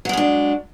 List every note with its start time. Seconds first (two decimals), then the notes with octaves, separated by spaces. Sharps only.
0.05 F#3
0.09 G#3
0.13 C#4
0.17 D4